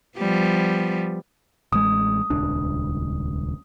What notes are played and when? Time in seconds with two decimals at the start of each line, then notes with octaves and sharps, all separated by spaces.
0.18 F3 G3 B3
1.73 A1 G#3 D#6
2.30 D#1 C#2 D4